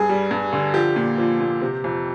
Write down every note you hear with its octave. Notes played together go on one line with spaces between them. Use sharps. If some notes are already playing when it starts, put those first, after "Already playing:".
Already playing: G2 G#4
G3
G2
D3
F3 G4
A#2
F3
A#2
C3
F2